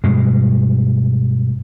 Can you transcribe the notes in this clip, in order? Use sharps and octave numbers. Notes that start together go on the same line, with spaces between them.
G2 B2 G#3